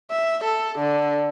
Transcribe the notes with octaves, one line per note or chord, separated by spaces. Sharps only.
E5
A4
D3